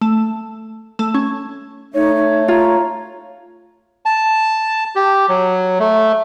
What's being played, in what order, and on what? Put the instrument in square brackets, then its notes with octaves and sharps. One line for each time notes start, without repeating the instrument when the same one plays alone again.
[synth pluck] A3
A3
C#4
[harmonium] A3 [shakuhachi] D#4 [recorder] C#5
[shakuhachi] D#4
[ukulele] F4 [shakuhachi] A#5
[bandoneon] A5
G4
F#3
A3